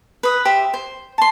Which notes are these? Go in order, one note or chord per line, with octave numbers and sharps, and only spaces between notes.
B4 D#6
G4 C5 E5
C5
A5 C6